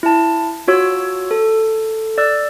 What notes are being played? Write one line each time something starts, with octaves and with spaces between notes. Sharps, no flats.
E4 A5
F4 F#4 C#5 E6
A4
D5 E6 F#6